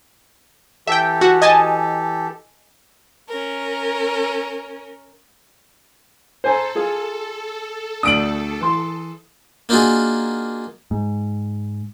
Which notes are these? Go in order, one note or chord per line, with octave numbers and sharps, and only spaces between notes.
E3 G4 A4 E5 G5
F#4
D#5 G#5 A5
C#4 A#4
A4 C5 G#5 A#5
F4 G#4
D2 A3 D4 D#6 D7 F#7
E3 C6
A#3 D4 D#4 F4 F#4 G#4
G#2